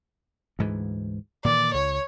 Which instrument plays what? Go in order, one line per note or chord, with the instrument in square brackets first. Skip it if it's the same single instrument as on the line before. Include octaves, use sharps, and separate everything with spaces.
[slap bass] D2 G#2 E3
[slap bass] A#2 D#3 E3 [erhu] D5
[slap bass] C#2 [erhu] C#5